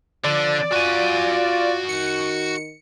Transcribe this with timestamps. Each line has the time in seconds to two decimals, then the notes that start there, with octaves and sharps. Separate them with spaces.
0.24 D3 F3 D5
0.72 F4 F#4 G#5
1.89 D#3 C#7